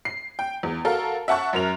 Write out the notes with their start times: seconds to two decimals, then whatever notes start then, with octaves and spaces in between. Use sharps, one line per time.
0.05 C7
0.39 G5
0.63 E2
0.85 F#4 A4 A#4 F5
1.28 E5 F#5 A5 C#6 F#6
1.53 F#2 A#4 F7